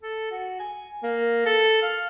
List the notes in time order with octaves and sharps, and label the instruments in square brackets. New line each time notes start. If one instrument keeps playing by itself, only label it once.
[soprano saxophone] A4
F#4
G#5
A#3
A4
F5